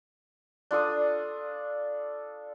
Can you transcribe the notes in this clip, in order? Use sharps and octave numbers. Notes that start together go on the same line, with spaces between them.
D4 F4 A4 D#6